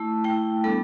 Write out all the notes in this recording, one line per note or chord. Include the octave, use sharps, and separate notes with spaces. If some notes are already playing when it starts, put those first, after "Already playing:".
Already playing: A3 E4 A5
A3 E4 G5
G3 B3 D4 A4